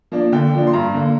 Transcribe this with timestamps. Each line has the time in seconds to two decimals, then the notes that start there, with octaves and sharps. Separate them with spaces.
0.12 F3 A#3 D4
0.32 D3 G5
0.54 F3 A#3 D4
0.67 C6
0.73 G2 A#5
0.94 D3 A#3